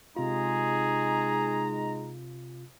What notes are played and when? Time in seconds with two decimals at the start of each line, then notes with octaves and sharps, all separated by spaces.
0.17 C3 G#3 D#4 F4 G#4 A#5